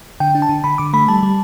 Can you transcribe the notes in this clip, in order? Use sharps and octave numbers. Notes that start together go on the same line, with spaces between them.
D3 G5
D4
A5
D3
D3 B5
D3 D6
A3 B5
G3 A5
G3